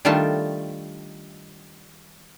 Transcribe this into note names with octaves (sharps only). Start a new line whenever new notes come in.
D#3 G3 A3 D4 F4 A5